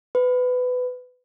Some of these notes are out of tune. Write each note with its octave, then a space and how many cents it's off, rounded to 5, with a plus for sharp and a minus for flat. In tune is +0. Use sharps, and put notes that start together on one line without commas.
B4 +20